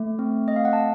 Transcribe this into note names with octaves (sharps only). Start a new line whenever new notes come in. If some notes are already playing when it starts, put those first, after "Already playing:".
Already playing: A3
C4
A3 D#5
F5
F#5
A5